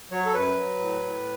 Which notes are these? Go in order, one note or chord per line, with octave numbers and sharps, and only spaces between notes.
F#3 C#5
A4
F#2 B4
F#3
A2
A2